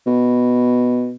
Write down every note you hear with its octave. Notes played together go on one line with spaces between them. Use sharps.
B2